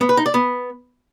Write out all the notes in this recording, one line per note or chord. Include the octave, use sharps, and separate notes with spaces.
B3
B4
D#4
D5
B3